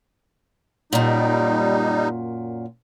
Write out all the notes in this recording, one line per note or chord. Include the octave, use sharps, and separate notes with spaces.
F#2 A#2 G3 D#4